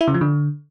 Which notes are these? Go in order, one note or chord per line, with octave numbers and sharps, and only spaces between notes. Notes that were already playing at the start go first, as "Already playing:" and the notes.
E4
C#3
F3
D3